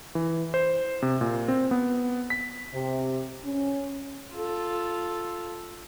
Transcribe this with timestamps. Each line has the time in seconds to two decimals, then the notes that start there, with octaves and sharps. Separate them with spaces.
0.15 E3
0.54 C5
1.02 C3
1.21 A#2
1.48 C4
1.71 B3
2.30 B6
2.74 C3
3.45 C#4
4.35 F4 A4